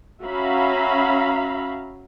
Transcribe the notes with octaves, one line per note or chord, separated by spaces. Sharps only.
C#4 F#4 E5 F5 A#5 B5